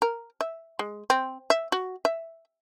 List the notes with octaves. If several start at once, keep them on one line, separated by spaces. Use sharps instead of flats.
A#4
E5
G#3
C4
E5
F#4
E5